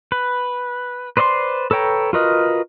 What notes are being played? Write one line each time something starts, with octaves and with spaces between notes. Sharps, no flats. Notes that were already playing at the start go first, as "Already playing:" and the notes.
B4
B4 C5 D5 D#5 C6
A4 B4 C#5 G5 A#5
F4 F#4 A#4 B4 D#5